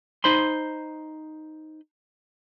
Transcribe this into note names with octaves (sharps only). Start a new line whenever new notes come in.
D#4 C5 B5 C6